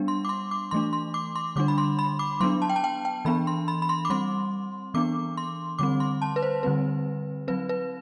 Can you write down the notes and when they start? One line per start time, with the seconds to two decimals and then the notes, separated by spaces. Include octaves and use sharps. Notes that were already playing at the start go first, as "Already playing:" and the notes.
Already playing: G3 B3 D4
0.08 C6
0.25 D6
0.29 C6
0.51 D6
0.71 E3 A3 D4 C6
0.93 C6
1.14 D6
1.36 C6
1.56 D3 G3 D4 D6
1.68 B5
1.78 C6
1.99 B5
2.19 D6
2.40 F#3 B3 D4 C6
2.62 A5
2.69 G5
2.76 A5
2.84 G5
3.05 G5
3.25 E3 B3 D4 B5
3.47 C6
3.68 B5
3.82 B5
3.89 C6
4.05 D6
4.10 G3 C4 C6
4.94 E3 B3 D4 D6
5.37 C6
5.79 D3 G3 C4 D6
6.00 C6
6.22 A5
6.36 B4
6.42 C5
6.63 D3 G3 C4 B4
7.48 F#3 C4 B4
7.69 B4